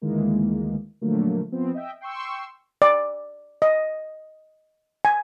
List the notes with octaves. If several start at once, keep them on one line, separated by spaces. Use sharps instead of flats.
D2 D#3 E3 G#3 A#3
A#2 D3 F3 F#3 A3 A#3
F3 B3 C4
D#5 E5 G5
G5 C6 C#6 E6
D5
D#5
G#5